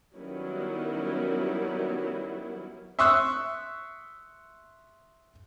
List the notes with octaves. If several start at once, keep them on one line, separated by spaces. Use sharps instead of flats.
D#3 F#3 G3 B3 C#4 E4
E5 C6 C#6 D#6 E6 F#6